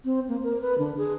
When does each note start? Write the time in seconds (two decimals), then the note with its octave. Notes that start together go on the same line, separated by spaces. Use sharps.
0.05 C4
0.28 A#3
0.43 A#4
0.61 B4
0.78 D3
0.97 G#4